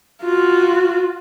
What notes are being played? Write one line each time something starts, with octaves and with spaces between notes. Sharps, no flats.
F4 F#4